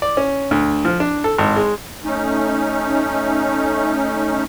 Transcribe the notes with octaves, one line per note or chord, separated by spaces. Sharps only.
D5
C#4
D2
F3
D4
A4
G#1
G#3
A3 C#4 D#4